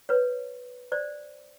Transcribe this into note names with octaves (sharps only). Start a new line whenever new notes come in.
B4 C#5
C5 D5